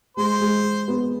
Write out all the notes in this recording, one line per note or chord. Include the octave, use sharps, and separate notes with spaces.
G#3 C5
G#3
B3